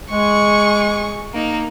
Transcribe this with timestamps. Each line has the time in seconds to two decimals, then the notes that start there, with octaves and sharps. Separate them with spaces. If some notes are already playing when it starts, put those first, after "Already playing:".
0.10 G#3 G#4 C#6
1.34 A#3 D#4